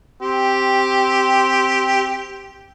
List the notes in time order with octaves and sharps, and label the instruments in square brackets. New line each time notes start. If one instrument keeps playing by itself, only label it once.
[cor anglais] C4 [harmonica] G4